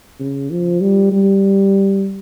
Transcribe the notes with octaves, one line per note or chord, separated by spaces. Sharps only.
C#3
F3
G3
G3